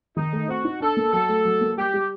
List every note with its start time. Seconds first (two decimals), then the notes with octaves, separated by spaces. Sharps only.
0.16 D#3 D#4
0.33 A3
0.48 C4 F#4
0.65 D#4
0.80 D4 A4
0.97 A#3
1.12 F#3 A4
1.29 A3
1.45 F#3
1.61 A#3
1.77 G3 G4
1.94 G3